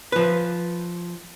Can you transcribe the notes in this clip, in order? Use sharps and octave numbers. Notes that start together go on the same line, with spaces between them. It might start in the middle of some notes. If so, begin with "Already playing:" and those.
F3 B4